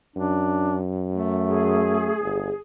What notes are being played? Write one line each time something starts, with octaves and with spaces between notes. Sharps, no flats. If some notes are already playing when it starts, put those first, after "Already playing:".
F#2 D4
A3
G#4
G1